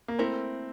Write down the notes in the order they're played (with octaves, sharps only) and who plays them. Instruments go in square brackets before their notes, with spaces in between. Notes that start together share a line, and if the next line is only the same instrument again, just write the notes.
[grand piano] A#3
[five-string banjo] A3 E4 A#4 [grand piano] C4